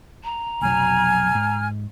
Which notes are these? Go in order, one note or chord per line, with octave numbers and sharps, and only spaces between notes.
A#5
F1 B1 F#3 G#5 F6
G#2